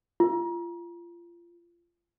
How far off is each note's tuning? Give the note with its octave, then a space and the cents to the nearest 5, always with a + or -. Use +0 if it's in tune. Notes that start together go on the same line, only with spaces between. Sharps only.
F4 -25